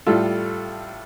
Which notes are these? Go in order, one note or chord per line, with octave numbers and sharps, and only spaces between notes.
A2 G3 F4 A4